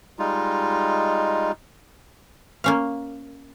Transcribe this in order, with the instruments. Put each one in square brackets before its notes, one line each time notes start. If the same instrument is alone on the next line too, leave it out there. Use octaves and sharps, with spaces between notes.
[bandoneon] G3 G#3 D#4 F4
[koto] A#3 C#4 F5